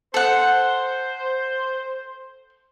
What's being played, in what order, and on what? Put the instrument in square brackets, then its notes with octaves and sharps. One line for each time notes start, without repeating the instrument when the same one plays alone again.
[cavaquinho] A4 F#5 [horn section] C5